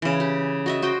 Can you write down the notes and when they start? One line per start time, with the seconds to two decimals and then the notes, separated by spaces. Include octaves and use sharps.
0.02 C#3 E3
0.20 G4
0.66 F#4 D#5 E5
0.82 F#4 C5 D#5 G5